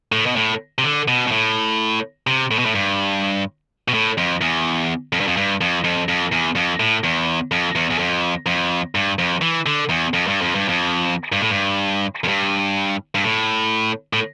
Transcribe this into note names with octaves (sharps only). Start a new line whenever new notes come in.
A2
B2
A2
C3
D3
B2
B2
A2
C3
A2
B2
A2
G2
B2
A2
F2
E2
F2
G2
F2
G2
F2
F2
F2
E2
F2
A2
E2
F2
E2
E2
F2
F2
G2
F2
E3
D3
E2
F2
G2
F2
G2
F2
G2
A2
G2
F2
G2
G2
A2
A2